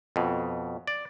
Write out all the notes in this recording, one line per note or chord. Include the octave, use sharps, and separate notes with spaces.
F2 B2
D5